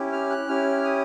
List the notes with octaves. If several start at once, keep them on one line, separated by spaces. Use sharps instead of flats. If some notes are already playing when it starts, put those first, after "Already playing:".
Already playing: C#4 E4 G4
F6
F#6
C#4 E4 G4 F6
D#6